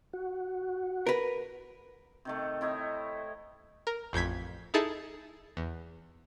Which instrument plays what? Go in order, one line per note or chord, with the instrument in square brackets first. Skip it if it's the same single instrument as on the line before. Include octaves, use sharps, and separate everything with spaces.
[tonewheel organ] F#4
[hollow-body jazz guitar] A#4 B4
[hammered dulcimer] C3 D#3 A3
C3 E4 C#5 D#5
[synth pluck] A#4
A1 F2 G6 G#6 B6
D#4 E4 G#4 A4 A5
E2